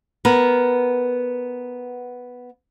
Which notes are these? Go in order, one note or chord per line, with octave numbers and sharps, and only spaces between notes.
B3 A#4 B4